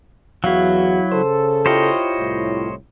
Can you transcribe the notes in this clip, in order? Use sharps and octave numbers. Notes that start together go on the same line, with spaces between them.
E2 F#3 E4 F#4 F5
C#3 A4 C5
E4 F4 G4 C5 C#5 D#5
C2 A2